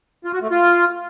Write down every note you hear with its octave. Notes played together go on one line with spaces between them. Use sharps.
F4
F#4
A3
F4